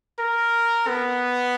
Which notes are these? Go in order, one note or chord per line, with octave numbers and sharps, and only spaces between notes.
A#4
B3